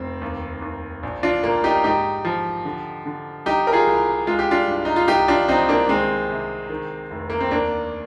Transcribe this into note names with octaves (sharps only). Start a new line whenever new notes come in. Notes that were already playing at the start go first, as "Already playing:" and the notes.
Already playing: F1 C4
D#2
D#2
A#1
D4 F4
A#2 A#3
D#4 G4
G#2 D#4 G4
F3
D3
D3
G3 D#4 G4
A#4
F4 G#4
C2
G#3 F4
G4
D4 F4
G2
D#4
F4
C2 D#4 G4
D4 F4
C2 C4 D#4
A#3 D4
D#3 G#3 C4
C3
D#3
F1
A#3
C4
D#2 A#3 D4